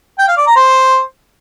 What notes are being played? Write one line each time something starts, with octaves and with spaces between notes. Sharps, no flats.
G5
F5
D5
A#5
C5